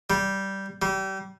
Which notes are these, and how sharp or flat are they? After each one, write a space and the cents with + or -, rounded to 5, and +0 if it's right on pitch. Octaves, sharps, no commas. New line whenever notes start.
G3 -10
G3 -30